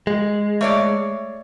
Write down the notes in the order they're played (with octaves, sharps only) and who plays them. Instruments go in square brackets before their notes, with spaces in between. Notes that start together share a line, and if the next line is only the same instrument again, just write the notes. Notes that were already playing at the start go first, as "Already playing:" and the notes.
[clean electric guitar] G#3
[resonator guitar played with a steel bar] A3 C#5 D5